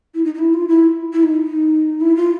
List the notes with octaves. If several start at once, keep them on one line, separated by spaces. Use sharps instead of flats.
E4
D#4
D#4
E4
F4
E4
E4
D#4
D#4
E4
F4